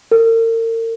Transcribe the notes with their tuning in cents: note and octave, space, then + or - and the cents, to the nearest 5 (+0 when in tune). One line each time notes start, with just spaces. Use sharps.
A#4 -40